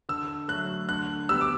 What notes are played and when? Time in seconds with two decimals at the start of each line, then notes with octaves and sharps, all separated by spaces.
0.09 D3 E6
0.48 F#3 A3 F#6
0.89 D3 F#6
1.29 G3 B3 E6
1.41 D6